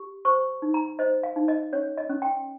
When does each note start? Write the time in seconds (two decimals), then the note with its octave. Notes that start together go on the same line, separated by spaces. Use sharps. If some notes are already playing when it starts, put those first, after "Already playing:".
Already playing: G4
0.25 C5 C#6
0.62 D#4
0.74 A#5
0.99 C5 D#5
1.23 F5
1.36 D#4
1.48 D#5
1.73 C#4 C#5
1.97 D#5
2.10 C#4
2.22 G5